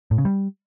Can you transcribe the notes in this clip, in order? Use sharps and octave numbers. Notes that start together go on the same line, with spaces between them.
A2
C#3
G3